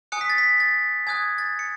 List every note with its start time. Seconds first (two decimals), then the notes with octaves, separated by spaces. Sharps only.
0.12 G#5 D#6 F#6 C#7
0.21 B6
0.30 A6
0.38 B6
0.60 A6
1.07 G#5 D#6 F#6 G#6
1.38 A6
1.59 C#7